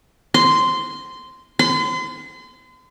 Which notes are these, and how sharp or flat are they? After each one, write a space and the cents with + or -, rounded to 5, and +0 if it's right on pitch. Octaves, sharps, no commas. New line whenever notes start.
C6 -10
C6 -40